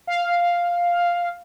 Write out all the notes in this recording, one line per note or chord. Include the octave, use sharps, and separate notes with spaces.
F5